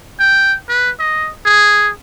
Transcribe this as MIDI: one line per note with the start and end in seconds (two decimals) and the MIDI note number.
0.20 0.55 79
0.68 0.91 71
0.99 1.30 75
1.45 1.91 68